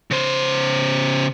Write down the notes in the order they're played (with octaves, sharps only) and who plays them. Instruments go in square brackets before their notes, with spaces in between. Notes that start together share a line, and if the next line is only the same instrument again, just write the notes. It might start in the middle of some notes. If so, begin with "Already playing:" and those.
[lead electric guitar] C#3 C5